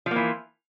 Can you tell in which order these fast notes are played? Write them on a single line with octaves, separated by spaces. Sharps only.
F3 A#3 E3